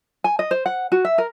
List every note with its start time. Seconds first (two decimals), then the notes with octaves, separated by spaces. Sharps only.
0.24 G#5
0.39 D#5
0.51 C5
0.66 F#5
0.92 F#4
1.05 E5
1.18 A#4